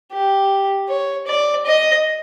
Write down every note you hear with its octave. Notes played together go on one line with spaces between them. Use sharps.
G4
C#5
D5
D#5